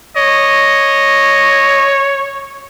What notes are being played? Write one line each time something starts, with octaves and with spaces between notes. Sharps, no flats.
C#5 D#5